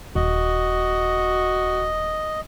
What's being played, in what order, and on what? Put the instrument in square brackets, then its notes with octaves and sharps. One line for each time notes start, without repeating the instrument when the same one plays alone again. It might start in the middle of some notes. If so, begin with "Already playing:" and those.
[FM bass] D#1 [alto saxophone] F#4 [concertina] D#5